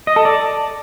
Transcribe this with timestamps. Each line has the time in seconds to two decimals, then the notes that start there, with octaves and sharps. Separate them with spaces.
0.07 D#5
0.16 A4
0.25 D5